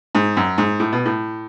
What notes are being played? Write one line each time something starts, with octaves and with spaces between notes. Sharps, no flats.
G#2
F#2
G#2
A2
B2
A2